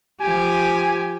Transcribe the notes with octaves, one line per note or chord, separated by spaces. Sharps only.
F3 G4 G#5